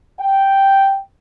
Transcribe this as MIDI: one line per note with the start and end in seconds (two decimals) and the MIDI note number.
0.20 0.98 79